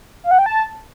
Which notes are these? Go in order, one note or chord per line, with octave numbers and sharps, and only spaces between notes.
F5
F#5
G5
A5